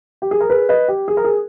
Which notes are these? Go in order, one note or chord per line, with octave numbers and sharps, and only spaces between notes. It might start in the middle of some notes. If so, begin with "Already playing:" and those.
G4
G#4
A#4
G#4 B4
B4 D#5
G4
G#4
A#4
G#4